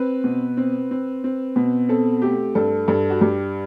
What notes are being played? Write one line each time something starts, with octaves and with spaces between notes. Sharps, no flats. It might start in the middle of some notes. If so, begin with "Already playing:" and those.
Already playing: C4 B4
B2
C4
C4
C4
B2
C4 A4
A3 G4
G2 A4
G2 A4
F#4
G2 G4